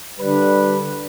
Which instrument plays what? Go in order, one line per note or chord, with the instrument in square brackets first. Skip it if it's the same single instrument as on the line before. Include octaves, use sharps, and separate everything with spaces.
[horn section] D3 G3 D4 B4